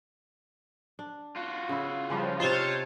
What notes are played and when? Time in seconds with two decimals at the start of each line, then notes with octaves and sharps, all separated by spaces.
0.99 D4
1.36 F4 F#4
1.69 C#3 E4
2.10 C#3 F3 G3 B4
2.40 C3 D#4 F4 C5 C#5 A5